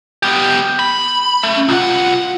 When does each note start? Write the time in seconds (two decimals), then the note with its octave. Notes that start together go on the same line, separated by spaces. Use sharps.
0.23 B3 G4
0.79 B5
1.43 A3
1.56 C#4
1.69 C2 F4 F#5